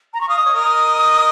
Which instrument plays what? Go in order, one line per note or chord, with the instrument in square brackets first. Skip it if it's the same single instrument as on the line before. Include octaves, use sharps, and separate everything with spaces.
[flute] A#5
C#6
[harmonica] F5 [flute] D#6
[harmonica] D#5
C#5
A#4 D#5